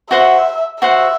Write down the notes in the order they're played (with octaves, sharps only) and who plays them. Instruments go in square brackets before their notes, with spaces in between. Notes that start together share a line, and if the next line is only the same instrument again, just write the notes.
[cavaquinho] F#4 C5 F#5 [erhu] E5
[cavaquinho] F#4 C5 F#5 [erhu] E5